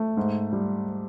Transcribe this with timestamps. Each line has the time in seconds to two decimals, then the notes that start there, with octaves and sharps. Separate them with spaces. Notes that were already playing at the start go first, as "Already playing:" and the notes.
Already playing: A3
0.17 G#2
0.53 G3